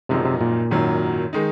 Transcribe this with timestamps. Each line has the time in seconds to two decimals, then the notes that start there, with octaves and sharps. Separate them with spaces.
0.09 G#1 F#2 C3 F3 G#3 D#4
0.25 C3
0.41 A#2
0.71 G#1 F#2 D#3 F#3
1.33 D#3 G#3 D#4